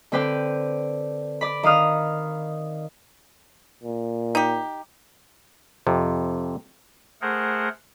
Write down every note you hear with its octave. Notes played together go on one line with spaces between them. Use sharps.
D3 C4 B4 D5 G5
D5 B5
D#3 F5 D#6 F6
A#2
D#4 G4
F2 C3
A3 G#4 A#4 C5 F#5